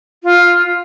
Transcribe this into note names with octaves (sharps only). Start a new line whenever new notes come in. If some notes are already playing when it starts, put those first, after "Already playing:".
F4